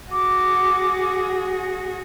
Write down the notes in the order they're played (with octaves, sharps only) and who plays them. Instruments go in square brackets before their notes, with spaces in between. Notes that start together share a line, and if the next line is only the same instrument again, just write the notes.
[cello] F#4 G#4 [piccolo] D6